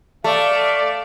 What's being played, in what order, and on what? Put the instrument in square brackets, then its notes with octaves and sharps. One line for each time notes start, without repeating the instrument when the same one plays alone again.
[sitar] A3 [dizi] D5 [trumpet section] F5